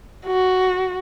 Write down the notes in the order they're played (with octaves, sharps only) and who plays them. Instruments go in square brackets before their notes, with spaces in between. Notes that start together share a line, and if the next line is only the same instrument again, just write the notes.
[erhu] F#4